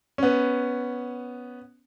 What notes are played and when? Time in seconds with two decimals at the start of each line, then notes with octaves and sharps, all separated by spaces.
0.18 B3 C#4